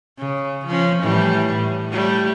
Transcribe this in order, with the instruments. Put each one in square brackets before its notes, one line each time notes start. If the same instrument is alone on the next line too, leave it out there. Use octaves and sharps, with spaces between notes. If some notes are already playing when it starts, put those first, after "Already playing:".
[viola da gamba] C#3
F3 C#4
A2 E3 G3
A2
G3 A3